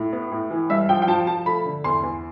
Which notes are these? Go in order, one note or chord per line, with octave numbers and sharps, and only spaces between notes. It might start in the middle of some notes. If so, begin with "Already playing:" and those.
Already playing: A2
B3
A2
E3
G2 E5
F3 G5
G5
F3 A5
F3 A5
A3 B5
D3
E2 C6
E2